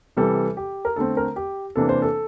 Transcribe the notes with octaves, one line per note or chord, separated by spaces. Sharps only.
C3 E3 G3 A4
G4
A#4
D3 A3 C4 A4
A#4
G4
C3 E3 A#3 D4 A4
C5
A4